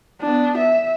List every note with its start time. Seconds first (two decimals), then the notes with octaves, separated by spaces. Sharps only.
0.22 B3 D4
0.58 E5